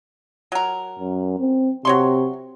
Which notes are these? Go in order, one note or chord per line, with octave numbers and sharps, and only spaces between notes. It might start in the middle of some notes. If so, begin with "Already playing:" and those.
F#3 A#4
F#2
C4
C3 F#3 C#5 C6